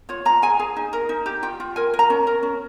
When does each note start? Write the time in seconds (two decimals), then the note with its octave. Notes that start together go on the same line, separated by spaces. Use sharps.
0.09 F4 C#5
0.25 F4 A#5
0.42 G#4 G#5
0.59 G#4
0.77 D#4
0.93 A#4
1.09 D#4
1.26 G4
1.43 F4 G5
1.60 F4
1.76 A#4 G#5
1.94 A#4
1.99 A#5
2.10 C#4
2.27 A#4
2.43 C#4